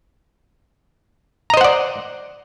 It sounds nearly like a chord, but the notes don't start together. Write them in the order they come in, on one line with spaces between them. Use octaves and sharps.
A#5 D#5 C5 F#5 D5